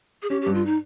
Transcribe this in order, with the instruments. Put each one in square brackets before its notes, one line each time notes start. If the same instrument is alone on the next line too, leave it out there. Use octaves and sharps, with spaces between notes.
[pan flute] G#4
[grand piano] C#4 [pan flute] G4
[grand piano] G2 [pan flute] G4
[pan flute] F4
D#4